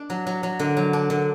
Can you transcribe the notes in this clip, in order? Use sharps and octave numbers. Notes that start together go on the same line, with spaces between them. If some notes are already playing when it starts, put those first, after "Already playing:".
Already playing: D4
F#3
F#3
F#3
D3
F#3
D4
D3